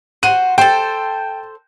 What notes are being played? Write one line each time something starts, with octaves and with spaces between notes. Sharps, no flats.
F#4 C5 D#7
A4 C5 G5